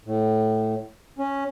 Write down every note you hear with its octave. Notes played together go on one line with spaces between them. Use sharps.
A2
C#4